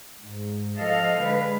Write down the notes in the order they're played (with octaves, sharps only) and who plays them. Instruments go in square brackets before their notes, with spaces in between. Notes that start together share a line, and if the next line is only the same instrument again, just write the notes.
[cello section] G#2
F3 A4 D#5 F5
D3 G#3 B4